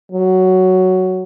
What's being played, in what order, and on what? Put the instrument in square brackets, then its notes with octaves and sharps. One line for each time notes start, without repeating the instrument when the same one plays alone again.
[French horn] F#3